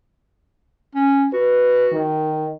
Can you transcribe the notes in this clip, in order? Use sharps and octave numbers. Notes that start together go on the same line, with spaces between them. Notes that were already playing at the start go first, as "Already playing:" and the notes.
C#4
F#4 B4
D#3